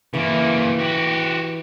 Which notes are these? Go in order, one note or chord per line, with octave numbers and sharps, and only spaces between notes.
C#3 E3 A#3
F#4 G4